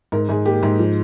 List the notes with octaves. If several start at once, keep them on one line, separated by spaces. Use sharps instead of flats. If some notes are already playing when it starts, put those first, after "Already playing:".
G#2 A#4
G#2 G#4
A#3 G4
G#2
F3